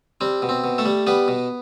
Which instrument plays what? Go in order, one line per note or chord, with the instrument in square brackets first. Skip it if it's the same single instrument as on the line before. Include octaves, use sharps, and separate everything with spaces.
[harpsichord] G3 C4
B2
C4
B2
A3 A4
G3
G3 B3 B4
B2